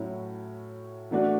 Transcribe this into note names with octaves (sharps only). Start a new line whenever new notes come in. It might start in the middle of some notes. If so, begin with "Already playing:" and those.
Already playing: A2 F#3 C#4 E4
E3 A3 D4 F#4